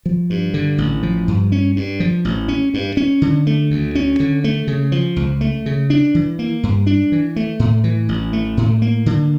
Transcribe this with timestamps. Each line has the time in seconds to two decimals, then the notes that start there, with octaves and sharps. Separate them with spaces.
0.06 F3
0.30 G2
0.54 D3
0.78 A1
1.03 F3
1.28 G2
1.52 C#4
1.76 G2
2.00 F3
2.25 A1
2.48 C#4
2.74 G2
2.97 C#4
3.22 D3
3.47 A3
3.71 D2
3.95 C#4
4.20 D3
4.44 A3
4.67 C#3
4.92 F3
5.16 C#2
5.41 A3
5.66 C#3
5.90 D4
6.15 E3
6.39 A#3
6.63 G2
6.87 D4
7.12 E3
7.36 A3
7.59 A2
7.84 E3
8.09 A1
8.33 A3
8.57 A2
8.82 A#3
9.06 D3